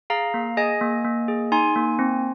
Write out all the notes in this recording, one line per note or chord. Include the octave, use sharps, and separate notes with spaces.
G#4 F5 A#5
A#3
G#4 D#5 G#5
A#3
A#3
G#4
D#4 G#5 C6
A#3
C4